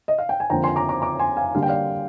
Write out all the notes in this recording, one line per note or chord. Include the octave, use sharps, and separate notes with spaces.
D#5
F5
G5
G#5
F2 D3 F3 A#3 G5 A#5
G#5 C6
A#5 D6
A#5 D6
A#5 D6
G#5 C6
F5 G#5
D3 G3 A#3 F5
G5
D5 F5